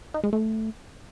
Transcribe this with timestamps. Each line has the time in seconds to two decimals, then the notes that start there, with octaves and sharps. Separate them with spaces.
0.14 D#4
0.24 G#3
0.33 A3